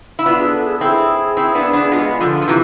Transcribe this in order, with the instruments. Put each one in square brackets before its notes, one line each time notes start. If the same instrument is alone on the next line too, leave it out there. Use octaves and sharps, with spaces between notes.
[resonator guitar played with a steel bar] E4
[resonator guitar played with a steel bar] B3 D4 [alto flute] F4
[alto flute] G#4
A4
G#4
A4
[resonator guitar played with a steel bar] C4 E4 [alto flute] G#4
[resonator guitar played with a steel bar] C4 E4
B3 D4
B3 D4
[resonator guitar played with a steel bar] G#3 B3 [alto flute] F4
[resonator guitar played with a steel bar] D3 F3 [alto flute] F4
[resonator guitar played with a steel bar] F3
[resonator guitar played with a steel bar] C3 E3 [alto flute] E4